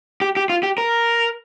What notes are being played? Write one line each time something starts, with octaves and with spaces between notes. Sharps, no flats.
G4
G4
F4
G4
A#4